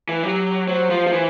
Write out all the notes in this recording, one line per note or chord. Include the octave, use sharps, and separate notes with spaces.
E3
F#3 G4
F#3 C5
F3
F3
E3